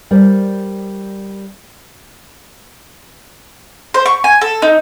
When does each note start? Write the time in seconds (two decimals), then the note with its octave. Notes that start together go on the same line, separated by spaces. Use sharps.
0.11 G3 A#4 C5 D5
3.94 C5
4.06 C#6
4.24 G#5
4.41 A4
4.62 D#4